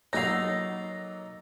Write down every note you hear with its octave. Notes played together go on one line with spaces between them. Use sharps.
F#3 A#3 D#4 A4 C#5 F#5 A#6 F7